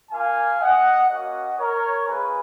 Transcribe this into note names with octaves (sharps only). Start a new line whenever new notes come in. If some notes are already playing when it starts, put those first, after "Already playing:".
A#3 F4 F5 G#5
D#5 F#5
A#3 C#4 F#4 D#5 F#5
A#4 C#5
G#3 C#4 F4 G#4 B4